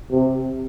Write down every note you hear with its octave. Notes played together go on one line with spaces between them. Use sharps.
C3